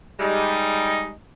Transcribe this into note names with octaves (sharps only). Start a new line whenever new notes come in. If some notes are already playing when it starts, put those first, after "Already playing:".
G3 G#3 D#4